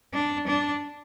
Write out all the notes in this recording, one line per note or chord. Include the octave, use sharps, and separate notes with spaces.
D4
D4